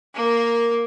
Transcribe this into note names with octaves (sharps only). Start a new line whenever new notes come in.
A#3 A#4